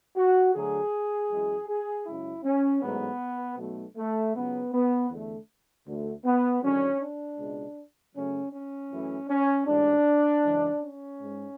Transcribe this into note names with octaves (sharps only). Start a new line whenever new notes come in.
F#4
D2 D3 F#3 A3 G#4
F#2 E3 G#3
G#4
F#2 C#3 G#3 E4
C#4
A1 G#2 F#3 A3 B3
B1 B2 A3
A3
C#2 C#3 F#3 B3
B3
E2 D3 A3
D2 D3 A3
B3
G#1 F#2 D3 C#4
D4
C#2 B2 G#3
F#2 C#3 F#3 A3 C#4
C#4
F#2 E3 A3
C#4
A1 G#2 E3 D4
F#2 C#3 E3 G#3
C#4
G#2 G#3